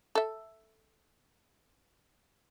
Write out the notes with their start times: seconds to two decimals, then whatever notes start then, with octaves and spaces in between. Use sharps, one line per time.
0.15 A4 E5